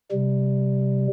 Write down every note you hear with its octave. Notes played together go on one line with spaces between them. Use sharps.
C3 G3